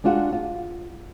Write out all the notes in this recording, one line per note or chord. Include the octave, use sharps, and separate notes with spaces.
G#3 D4 F4 F#4 F#5
F4